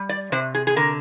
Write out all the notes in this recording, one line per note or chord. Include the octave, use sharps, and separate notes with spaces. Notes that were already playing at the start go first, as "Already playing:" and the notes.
Already playing: G3
D5
C3 C5
G#4
G#4
D3 A#4